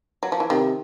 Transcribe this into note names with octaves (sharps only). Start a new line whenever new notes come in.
F#3
F3
E3
C3 D#3